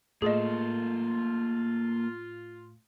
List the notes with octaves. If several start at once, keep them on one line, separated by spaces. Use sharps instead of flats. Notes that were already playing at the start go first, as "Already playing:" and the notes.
A2 A#3 F4 G#4 A4 D#5